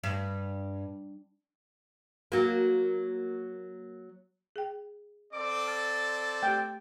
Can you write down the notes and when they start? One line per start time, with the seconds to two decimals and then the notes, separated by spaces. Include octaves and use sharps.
0.04 G2
2.32 F#3 A#3
4.56 G#4 G5
5.33 C4 A4 D5 D6
5.67 A5 F6
6.43 A3 G4 G5